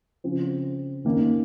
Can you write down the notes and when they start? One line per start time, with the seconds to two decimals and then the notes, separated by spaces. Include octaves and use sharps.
0.24 C#3 F3 C4
1.05 D#3 A#3 C#4